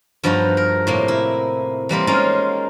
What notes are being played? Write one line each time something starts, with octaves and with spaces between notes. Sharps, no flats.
G2 F3 B3 D#4 F#4
A#4
A2 C3 A#3
E4
E3 G3 A#3 C4
G#3 A#3 C#4 D#4 F4